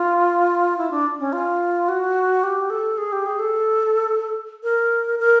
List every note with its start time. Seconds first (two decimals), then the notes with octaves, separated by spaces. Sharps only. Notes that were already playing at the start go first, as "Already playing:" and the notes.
Already playing: F4
0.78 E4
0.91 D4
1.20 C#4
1.33 F4
1.89 F#4
2.43 G4
2.70 A4
2.98 G#4
3.13 G4
3.26 G#4
3.39 A4
4.63 A#4
5.19 A#4